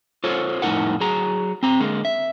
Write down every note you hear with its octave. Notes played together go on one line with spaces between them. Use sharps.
F4 A4 C5 C#5
F2 A2 C#4 D#4 A#4 F#5
F#3 G#4 A#5
C4 A#5
D3 G#3 A#3
E5